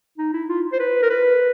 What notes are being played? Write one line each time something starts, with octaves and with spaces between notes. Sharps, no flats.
D#4
E4
F4
C5
B4
A#4
B4